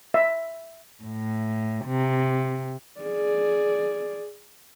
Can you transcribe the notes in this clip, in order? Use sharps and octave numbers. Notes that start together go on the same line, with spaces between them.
E5
A2
C3
G#4 D5